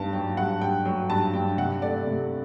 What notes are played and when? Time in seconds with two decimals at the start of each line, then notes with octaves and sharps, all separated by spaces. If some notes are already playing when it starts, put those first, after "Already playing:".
Already playing: G2 B3 A5
0.13 F#3 G5
0.37 G2 F#5
0.61 G2 G5
0.85 F#3 G5
1.10 G2 A5
1.34 G2 G5
1.58 C3 F#5
1.82 A3 D5
2.07 C3